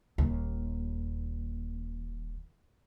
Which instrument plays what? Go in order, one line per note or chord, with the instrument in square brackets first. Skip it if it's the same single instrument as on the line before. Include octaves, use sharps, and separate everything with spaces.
[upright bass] D#1 D#2